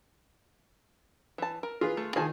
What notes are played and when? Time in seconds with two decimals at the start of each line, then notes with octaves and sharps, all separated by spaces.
1.38 E3 A5
1.63 A#4
1.81 F4 G#4 B4
1.97 A3
2.16 D#3 F4 G#4 G#5 A5